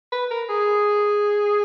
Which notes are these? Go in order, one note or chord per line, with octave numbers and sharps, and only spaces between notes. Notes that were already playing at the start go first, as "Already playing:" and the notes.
B4
A#4
G#4